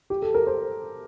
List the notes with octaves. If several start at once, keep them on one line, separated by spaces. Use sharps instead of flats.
G4
A4
A#4
C5